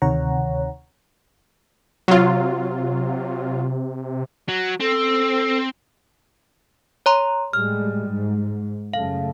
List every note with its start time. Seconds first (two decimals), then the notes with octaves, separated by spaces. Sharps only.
0.02 D2 C3 D#3 C#5 F#5 A#5
2.08 C3 F#3 F4
4.48 F#3
4.80 C4 A4
7.06 C#5 A#5 C6
7.53 A2 G3 G#3 F6
8.11 G#2
8.94 F#2 C#3 A3 F5